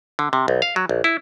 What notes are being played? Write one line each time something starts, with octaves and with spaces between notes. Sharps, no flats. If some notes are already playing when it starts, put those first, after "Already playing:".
D3
C3
B1
F5
F#3
A#1
E4